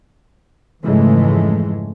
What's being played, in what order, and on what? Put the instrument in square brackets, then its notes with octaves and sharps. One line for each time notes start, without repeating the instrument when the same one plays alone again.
[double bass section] F2 G#2 C#3 E3 G#3 A3